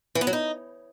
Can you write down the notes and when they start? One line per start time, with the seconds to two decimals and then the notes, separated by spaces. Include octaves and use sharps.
0.15 E3
0.21 B3
0.27 F#3
0.33 D#4